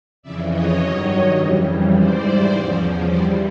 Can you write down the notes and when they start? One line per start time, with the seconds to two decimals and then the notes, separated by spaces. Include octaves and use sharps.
0.23 F2 C#3 E3 D5 E5
0.51 C#5 D#5
0.79 G2 D#3 F#3 C#5 D#5
1.37 F2 C#3 E3 G3
1.93 G#2 E3 G3 C5 D5
2.51 E2 C#3 F3
3.07 G2 E3 G3 C5 D5